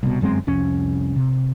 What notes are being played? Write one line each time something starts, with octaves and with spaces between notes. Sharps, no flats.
C2 B2
G1 F#2 G#3 C4
C2 F2 C#4
C3